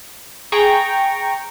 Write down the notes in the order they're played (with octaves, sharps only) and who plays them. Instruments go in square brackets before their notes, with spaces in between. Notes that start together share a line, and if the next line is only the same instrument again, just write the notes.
[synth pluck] G#4 [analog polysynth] G5 A#5 C#6